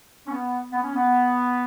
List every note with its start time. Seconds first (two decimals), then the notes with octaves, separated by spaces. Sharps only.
0.27 C#4
0.32 B3
0.72 B3
0.83 C#4
0.95 B3